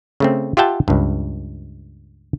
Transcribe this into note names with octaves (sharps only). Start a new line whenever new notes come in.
C#3 A3 C4
F4 G4 E5 F#5 G5 A5
C#2 G2